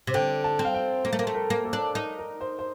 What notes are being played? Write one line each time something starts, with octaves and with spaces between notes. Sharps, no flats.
C3
D3 G5
A5
C4
F5
G5
A#3 A#4
A3
A#3
A3 C5
A#4
A#3
A4
D4
D#4 A#4
A#4
C5
C5